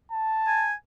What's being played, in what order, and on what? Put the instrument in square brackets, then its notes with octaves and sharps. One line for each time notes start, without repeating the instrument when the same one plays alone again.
[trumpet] A5
[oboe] G#5